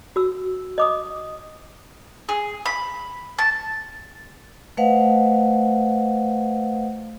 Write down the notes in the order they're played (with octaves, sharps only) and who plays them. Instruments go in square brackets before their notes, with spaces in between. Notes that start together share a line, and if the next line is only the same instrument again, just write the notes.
[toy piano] F#4 E6
D#5 D6 D#6
[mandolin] G#4
B5
A5
[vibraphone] A3 B4 C5 D#5 F5 F#5